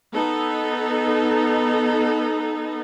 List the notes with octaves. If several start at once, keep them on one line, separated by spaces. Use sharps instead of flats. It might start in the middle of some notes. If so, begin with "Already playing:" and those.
B3 D#4 A4